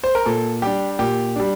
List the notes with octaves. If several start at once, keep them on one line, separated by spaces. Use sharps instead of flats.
C5
A#4
A#2 A4
G3 D4 G4
A#2 G4
G3 D4